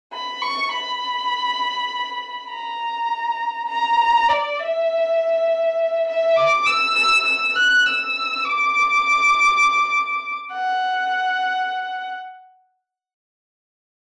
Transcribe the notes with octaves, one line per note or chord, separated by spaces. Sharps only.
B5
C#6
B5
A#5
A#5
D5
E5
E5
D6
E6
E6
E6
F#6
E6
D6
F#5